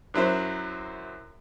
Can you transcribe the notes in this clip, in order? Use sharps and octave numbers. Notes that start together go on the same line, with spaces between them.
F#2 F#3 E4 C5